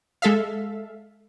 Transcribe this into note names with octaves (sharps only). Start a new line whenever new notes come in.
G#3 A4 E5 F5